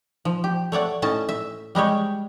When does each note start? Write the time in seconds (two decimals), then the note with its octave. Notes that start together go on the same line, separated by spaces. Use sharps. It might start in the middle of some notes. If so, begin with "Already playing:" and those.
0.25 F3
0.44 G4
0.72 A3 C#5 D5 F#5
1.02 A2 C#4 D#5 A5
1.29 E5
1.75 G3 G#3 G4 C#5